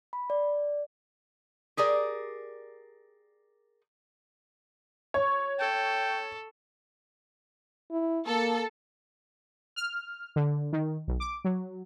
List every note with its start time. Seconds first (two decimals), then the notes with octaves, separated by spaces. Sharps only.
0.13 B5
0.30 D5
1.77 G4 G#4 A#4 D5
5.14 C#5 C#6
5.59 A4 G5
7.91 E4
8.27 A#3 A4
9.76 F6
10.36 D3
10.72 D#3
11.08 B1
11.20 D6
11.44 F#3